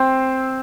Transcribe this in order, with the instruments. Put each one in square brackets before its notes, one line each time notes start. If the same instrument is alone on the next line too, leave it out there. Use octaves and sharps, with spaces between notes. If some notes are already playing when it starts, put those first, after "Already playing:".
Already playing: [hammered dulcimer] C4